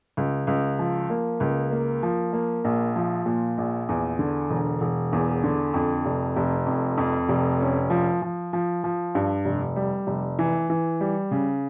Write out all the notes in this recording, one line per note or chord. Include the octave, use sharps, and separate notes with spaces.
C#2
C#2
F3
A#3
C#2
A#3
F3
A#3
A#1
F3
A#2
A#1
E2
D3
E1
E1
E2
D3
F2
F1
F1
F2
F2
F1
C#4
F3
F3
F3
F3
G2
F1
G3
F1
E3
E3
G3
C#3